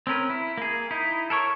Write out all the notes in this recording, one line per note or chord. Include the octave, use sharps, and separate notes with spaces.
C4 C#4 A#4 B4
E4
A#3 G#4
D#4 E4
A4 A#4 C#5 C#6